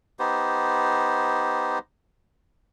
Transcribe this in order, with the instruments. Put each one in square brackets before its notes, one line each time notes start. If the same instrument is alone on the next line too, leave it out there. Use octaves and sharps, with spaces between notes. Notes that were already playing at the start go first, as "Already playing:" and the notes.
[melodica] B3 D#4 G4 C5